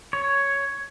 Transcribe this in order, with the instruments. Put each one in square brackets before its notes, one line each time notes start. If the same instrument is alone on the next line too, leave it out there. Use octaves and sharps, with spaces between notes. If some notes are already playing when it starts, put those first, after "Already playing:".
[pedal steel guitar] C#5